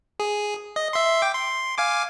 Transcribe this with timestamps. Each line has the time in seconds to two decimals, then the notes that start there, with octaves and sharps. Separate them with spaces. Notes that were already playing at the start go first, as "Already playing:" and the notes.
0.20 G#4
0.76 D#5
0.93 E5 C6
1.22 G5 D6
1.35 C6
1.78 F5 G#5 D6